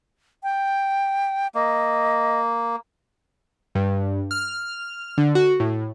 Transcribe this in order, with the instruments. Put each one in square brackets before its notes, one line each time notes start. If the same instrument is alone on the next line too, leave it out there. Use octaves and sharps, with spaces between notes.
[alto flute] G5
[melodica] A#3 [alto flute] D#5
[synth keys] G2
F6
D3
F#4
A2